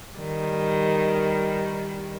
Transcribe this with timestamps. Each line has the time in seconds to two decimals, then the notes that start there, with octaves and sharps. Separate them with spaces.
0.17 D#3 G3